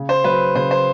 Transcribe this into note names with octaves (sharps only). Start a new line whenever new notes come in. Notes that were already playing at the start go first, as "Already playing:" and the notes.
Already playing: C#3
C5
F#3 B4
C#3 C5
C5